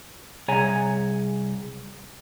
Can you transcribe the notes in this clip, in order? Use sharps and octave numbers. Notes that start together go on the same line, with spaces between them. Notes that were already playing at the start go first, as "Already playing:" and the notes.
C2 G#4 C#5 G#5 A#5